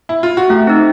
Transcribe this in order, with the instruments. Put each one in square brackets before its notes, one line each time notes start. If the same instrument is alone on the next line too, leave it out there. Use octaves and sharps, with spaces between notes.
[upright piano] E4
F4
F#4
[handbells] A3 [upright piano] G4
[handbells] C4 D#4